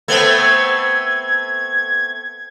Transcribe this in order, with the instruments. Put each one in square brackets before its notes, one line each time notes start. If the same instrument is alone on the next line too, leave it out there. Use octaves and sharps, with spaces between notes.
[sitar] A3 B3 C4 [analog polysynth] G#6